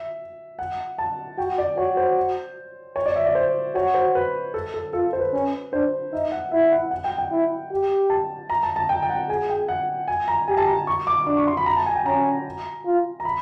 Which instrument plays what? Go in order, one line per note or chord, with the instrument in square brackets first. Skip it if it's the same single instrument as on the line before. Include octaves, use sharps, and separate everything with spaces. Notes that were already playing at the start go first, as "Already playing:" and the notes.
Already playing: [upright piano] E5
F#5
A5
[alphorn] F#4 [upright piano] G5
[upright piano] D5
[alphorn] F#4 [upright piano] C#5
[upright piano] C5
C#5
D5
E5
D5
C5
[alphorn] F#4 [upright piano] C#5
[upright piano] C5
B4
A4
A4
[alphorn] F4 [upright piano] A4
[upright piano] C5
B4
[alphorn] C#4
[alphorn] D4 [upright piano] C5
[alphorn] D#4 [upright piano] E5
[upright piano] F#5
[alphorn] E4 [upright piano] E5
[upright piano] F#5
F#5
G5
G5
[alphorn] E4
G4
[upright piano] A5
A#5
A5
A5
G5
G5
F#5
[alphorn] G#4 [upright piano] G#5
[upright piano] G5
F#5
G#5
A#5
[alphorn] G4 [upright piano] G#5
[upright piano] A5
A#5
C#6
D6
[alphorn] D4 [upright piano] D6
[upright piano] C#6
C6
B5
A#5
A5
G#5
G5
[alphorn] C#4 [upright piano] A#5
[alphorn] F4
[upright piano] A#5
B5